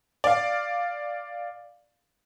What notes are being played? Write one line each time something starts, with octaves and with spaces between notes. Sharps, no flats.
D5 F5